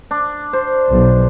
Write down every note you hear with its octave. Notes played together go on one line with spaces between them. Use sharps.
D4
C5
B1